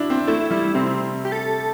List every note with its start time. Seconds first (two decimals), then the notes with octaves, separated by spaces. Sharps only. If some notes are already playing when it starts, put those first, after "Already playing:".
Already playing: D4 E4 F#4
0.10 C4
0.27 A3 E4
0.50 G3 E4
0.75 C3 C4
1.25 G4
1.32 A4